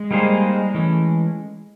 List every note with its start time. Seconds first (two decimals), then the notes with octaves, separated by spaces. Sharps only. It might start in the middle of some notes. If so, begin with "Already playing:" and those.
Already playing: G#3
0.11 G3 A#3 D#4 G#4 C5
0.74 E3 A3 C#4